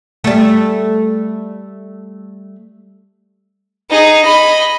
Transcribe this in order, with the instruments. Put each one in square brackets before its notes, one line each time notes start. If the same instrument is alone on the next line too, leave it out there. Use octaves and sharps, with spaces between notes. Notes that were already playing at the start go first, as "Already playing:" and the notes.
[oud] G3 A3
[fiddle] D#4 G#4
D#5 B5